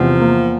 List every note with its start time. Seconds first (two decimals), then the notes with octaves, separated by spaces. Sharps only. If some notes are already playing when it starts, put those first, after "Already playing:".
Already playing: E2 C3 F3
0.21 A#3